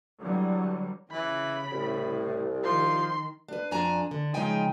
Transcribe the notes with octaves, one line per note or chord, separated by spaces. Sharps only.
D3 E3 F#3 G3
C#3 E3 B5
C2 A2
D#3 F3 C6
D4 B4
F2 D4 G#5 A#5
D3
C#3 F3 G#3 D#4 G5 G#5